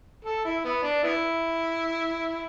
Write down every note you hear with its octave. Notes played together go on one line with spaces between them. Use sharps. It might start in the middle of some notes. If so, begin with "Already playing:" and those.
A4
E4
B3
D4
B3 E4